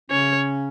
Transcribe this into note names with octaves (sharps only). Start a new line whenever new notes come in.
C#3 C#4 C#5